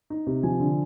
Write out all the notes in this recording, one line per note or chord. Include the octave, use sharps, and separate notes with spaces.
D#4
C3
F3 G#5
D3